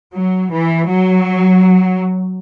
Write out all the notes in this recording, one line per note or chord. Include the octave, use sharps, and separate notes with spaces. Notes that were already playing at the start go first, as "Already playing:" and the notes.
F#3
E3
F#3